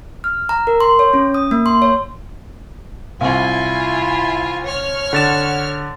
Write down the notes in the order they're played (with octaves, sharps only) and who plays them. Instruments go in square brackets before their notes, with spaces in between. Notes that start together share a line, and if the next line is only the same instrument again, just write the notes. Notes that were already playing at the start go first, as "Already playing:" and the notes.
[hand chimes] F6
A#5
A#4
C6
C#5
C#4
D#6
A#3
C6
C#5
[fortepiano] C2 [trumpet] E4 [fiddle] F4 G#5
[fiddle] C#5 F6
[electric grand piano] D3 A6 E7 [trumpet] F#5